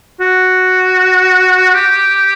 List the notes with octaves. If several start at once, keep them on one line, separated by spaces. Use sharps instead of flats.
F#4
G4